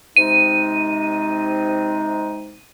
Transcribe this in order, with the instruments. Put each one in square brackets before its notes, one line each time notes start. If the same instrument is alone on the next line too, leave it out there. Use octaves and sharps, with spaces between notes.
[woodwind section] C3 G#3 D#4 [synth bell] D#7